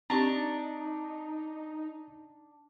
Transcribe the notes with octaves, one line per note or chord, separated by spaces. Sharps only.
C4 D4 D#4 G4 A#5 C#6